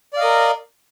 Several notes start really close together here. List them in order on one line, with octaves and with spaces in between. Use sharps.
D5 F5 D#5 A#4